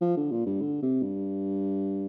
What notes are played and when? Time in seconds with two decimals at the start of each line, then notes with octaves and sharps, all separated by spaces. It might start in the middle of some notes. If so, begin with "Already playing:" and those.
0.01 F3
0.17 D3
0.32 A#2
0.46 G2
0.61 D3
0.83 C3
1.02 G2